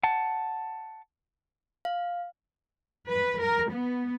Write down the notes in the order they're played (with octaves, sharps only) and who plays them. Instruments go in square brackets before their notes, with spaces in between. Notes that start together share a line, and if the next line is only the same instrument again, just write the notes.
[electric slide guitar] F#5 A5
[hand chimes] F5
[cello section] B4
A#4
B3